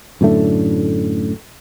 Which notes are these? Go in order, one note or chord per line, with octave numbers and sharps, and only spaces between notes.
F#2 A2 D3 A3